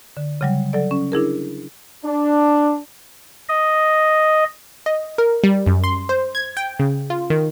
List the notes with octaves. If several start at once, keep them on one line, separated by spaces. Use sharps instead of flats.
D3
C#3 F#3 G3
F#3 A4 D5
C#4
D4 E4 G#4 A#4
D4
D#5
D#5
A#4
G3
F#2
C6
C5
G#6
G5
C#3
F4
D#3